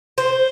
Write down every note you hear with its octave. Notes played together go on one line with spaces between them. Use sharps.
C5